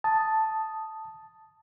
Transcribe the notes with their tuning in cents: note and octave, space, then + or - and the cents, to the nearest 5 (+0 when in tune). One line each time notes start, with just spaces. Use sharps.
A5 +0 D#6 +0